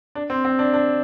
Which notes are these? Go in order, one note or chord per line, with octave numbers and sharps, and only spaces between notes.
D4
C4
C4
D4
D4